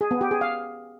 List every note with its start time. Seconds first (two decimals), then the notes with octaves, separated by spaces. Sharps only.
0.01 G#4
0.11 B3
0.21 G4
0.31 G#4
0.41 F5